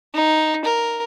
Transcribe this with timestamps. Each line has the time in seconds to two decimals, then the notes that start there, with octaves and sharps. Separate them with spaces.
0.14 D#4
0.65 A#4